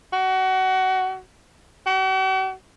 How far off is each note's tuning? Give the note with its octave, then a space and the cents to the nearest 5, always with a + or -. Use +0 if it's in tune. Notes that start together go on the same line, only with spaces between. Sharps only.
F#4 +25
F#4 +45